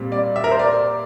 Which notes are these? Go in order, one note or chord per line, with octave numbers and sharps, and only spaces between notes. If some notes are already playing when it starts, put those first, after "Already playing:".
Already playing: A#2 G3 C4
D5
E5
A#4
C5
D5